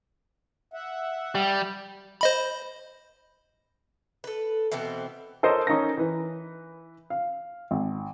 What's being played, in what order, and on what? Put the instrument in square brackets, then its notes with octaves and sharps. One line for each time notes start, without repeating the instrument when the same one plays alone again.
[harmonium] E5 F#5
[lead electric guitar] G3
[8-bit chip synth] C5 D#5 B5
[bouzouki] A4 B4
B2 E3 B3 C4
[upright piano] A4 A#4 C5 C#5 D#5
C#4 D#4 A#4 A#6
E3 B4
F5
G#1